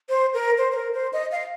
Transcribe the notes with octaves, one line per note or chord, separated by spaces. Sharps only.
C5
A#4
C5
C5
A#4
C5
D#5
F5